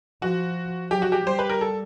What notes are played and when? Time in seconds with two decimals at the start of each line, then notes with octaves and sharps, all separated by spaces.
0.22 F3 F#4
0.91 F#3 G4
1.02 F#4
1.12 G4
1.26 G3 C5
1.39 B4
1.49 A#4
1.61 A4